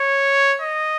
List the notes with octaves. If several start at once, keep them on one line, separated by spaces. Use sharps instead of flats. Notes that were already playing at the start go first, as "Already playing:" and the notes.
Already playing: C#5
D#5